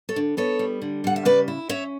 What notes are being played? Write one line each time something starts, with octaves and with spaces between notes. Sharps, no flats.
A4 C#5
D3
B3 A4 C#5
G3
D3
G3 F#5
E5
C#3 B4 D5
E4
C#4 C#5 E5